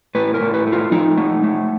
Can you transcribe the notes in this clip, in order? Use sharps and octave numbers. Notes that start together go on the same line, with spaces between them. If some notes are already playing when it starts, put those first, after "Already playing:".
A2 B4
A#4
A2
B4
A3
F4
F3 D#4
A3
A3